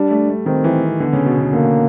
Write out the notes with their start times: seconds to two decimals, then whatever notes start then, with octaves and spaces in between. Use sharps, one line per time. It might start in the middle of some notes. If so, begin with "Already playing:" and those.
Already playing: G3 D4
0.11 A3
0.30 A3
0.46 D#3 C4
0.64 E3
1.00 D3 B3
1.13 C#3
1.26 B2
1.40 D3
1.53 D3 A#3